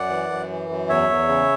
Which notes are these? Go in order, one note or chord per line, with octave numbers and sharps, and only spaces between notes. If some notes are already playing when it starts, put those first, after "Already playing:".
Already playing: F#2 D5 F#5
E3
F#2
E3
F#2
E2 C#5 E5
E2
C#3